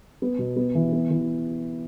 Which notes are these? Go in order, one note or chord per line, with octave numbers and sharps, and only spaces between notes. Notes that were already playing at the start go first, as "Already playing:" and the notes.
B3
B2
B3
E3
B3
E3